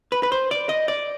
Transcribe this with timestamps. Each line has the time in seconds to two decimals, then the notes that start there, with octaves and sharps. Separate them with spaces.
0.12 B4
0.23 B4
0.32 C5
0.51 D5
0.69 D#5
0.88 D5